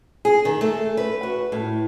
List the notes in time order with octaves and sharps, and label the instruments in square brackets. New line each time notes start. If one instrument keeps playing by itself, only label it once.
[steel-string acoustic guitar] G#4
D#3
A3
B4
F#4
A2